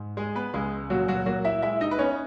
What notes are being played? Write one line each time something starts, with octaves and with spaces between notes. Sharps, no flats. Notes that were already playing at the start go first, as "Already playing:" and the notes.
Already playing: G#2
G#3 G#4
B3 B4
C#2 G#3 G#4
A#2 F#3 F#4
F#3 F#4
F#3 A#3 F#4
E4 E5
G#3 E4 E5
D#4 D#5
B4
B3 C#4 C#5